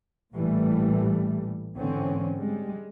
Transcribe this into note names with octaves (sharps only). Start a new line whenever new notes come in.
A1 A#2 E3 G3 A3
G#2 D3 E3 C4 C#4
G3 G#3